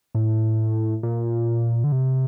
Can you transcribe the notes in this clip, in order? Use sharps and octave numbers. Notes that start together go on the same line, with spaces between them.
A2
A#2
D3
C3